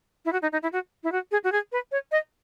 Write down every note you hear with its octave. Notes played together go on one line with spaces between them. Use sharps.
E4
F#4
D#4
D#4
E4
F#4
E4
F#4
G#4
F#4
G#4
B4
C#5
D#5